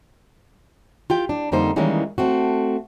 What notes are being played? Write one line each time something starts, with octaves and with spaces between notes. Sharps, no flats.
F4 G4 G5
D4
F2 D3 G3 A#3 D#4 C5
D#3 E3 G3 G#3 A#3 C#4
A3 C4 F#4